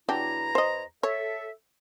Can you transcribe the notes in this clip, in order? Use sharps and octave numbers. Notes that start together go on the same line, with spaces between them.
E2 F#3 D4 E4 G4 A#5
C5 D#5
A4 C#5 E5